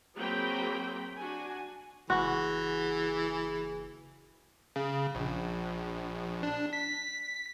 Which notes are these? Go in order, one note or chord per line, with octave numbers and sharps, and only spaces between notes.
F#3 A#3 C4 G#4 G5 B5
D4 F#4 G#5
F#1 E3 F#4 G#4
C#3
A#1
D4
B6